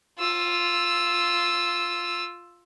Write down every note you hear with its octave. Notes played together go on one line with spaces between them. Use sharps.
F4 E6